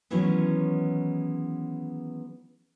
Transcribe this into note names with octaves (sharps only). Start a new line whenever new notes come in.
D#3 E3 F#3 G#3 B3 C#4